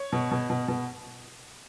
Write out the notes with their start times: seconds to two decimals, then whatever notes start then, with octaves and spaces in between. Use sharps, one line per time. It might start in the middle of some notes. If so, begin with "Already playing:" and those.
Already playing: C#5
0.12 B2
0.31 B2
0.50 B2
0.68 B2